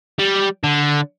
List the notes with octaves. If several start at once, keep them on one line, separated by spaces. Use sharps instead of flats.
G3
D3